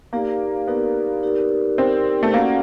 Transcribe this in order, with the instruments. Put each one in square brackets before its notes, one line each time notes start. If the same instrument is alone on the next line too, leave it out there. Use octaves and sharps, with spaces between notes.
[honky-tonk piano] A#3 [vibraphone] D#4 G4 A#4 D5
[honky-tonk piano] B3 [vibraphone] D#4 G4 A#4 D5
[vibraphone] D#4 G4 A#4 D5
[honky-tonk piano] C4 [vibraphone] D#4 G4 A#4 D5
[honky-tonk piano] A3
[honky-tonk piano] A#3 [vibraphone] C#4 F#4 A4 D5 F#5